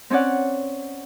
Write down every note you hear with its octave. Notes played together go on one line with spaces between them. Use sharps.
C4 C#4 C#5 D5 F#5